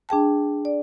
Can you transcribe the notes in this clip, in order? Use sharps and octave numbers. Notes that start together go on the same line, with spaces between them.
D4 G#4 G5 A5
D5